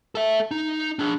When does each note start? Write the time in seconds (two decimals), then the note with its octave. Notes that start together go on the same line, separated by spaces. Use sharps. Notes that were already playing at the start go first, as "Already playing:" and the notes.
0.15 A4 E5
0.51 D#4
0.99 D4 G#4